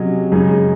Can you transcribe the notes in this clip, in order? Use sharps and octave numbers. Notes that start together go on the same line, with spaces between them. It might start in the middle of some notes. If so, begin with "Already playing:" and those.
Already playing: C3 F#3 C#4 G#4 D#5
F#2 C#3 G#3 D#4 G#4